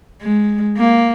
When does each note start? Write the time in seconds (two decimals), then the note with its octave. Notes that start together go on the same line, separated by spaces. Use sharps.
0.21 G#3
0.78 A#3